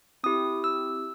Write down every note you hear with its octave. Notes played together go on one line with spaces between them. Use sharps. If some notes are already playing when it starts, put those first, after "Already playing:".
C4 E4 G4 D#6
E6